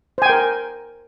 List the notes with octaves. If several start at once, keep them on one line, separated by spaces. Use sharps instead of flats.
A#4 C5 G5 G#5